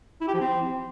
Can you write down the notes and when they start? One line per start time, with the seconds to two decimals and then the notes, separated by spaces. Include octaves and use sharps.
0.21 E4
0.28 G4
0.34 F3
0.41 C4